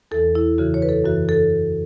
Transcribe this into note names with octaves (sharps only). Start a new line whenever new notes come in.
E2 E3 A4
E4
F#2 C#3 E3 F#4
C#5
B4
A4
F#2 C#3 E3 F#4
A4